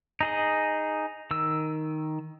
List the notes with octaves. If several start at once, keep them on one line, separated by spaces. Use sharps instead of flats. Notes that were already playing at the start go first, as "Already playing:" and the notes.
D#4 G#4 D#5
D#3 E6